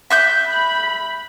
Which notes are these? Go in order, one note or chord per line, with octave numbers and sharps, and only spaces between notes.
E5 F#6 G6
B5